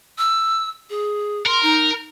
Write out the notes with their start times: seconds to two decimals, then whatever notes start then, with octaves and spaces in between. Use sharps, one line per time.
0.18 E6
0.90 G#4
1.46 A#4 C6
1.63 D#4